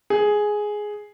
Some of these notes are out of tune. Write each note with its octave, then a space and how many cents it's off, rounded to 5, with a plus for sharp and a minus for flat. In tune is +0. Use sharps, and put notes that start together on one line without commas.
G#4 +5